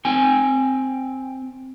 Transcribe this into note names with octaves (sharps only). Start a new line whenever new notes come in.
C4 G5 G#5